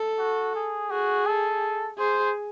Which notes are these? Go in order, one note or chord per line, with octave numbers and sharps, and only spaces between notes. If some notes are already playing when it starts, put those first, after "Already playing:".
Already playing: A4
F#4
G#4
F#4 G#4
A4
G#4 C5